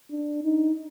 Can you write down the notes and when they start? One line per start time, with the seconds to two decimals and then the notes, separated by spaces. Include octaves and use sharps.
0.11 D4
0.44 D#4